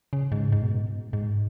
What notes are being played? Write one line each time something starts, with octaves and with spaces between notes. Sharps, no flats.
C#3
G#2
G#2
B2
G#2
B2
G#2